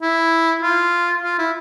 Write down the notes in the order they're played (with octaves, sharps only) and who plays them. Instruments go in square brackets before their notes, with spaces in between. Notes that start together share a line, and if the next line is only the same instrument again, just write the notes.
[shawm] E4
F4
F4
E4